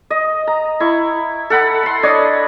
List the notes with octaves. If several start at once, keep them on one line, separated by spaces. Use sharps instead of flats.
D#5
A#5
E4 C#6
A4 F#5 B5
B5 C6
D4 C#5 D#5